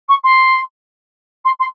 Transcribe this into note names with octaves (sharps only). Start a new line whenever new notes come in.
C#6
C6
C6
C6